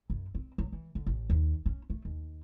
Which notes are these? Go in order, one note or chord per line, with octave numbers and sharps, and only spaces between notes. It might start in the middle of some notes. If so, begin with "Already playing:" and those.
F#2
C4
F#3
E3
D3
A1
D#2
C#4
A3
D#2